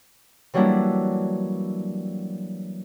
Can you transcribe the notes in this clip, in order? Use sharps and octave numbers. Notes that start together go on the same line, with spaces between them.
E3 F#3 G3 A#3 D4 E4